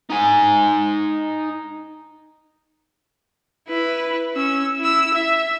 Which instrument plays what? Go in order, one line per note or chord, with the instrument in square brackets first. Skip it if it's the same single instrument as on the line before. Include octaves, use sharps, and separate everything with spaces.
[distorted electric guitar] D#4 G#5
[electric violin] E4 B4
C#4 E6
E4 E6
E5